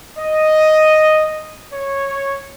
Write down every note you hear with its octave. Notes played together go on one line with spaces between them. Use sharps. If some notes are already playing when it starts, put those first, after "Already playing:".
D#5
C#5